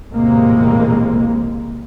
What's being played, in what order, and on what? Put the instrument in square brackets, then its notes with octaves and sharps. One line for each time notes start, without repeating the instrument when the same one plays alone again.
[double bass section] A#1 E2 A2 C3 G#3 A#3